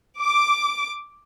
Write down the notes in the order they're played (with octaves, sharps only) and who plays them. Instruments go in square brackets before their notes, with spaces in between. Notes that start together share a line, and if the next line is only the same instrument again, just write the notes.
[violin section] D6